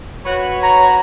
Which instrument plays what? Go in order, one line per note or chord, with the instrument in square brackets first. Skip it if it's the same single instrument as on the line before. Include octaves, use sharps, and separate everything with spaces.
[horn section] F#4 B4 C#5
[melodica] A#5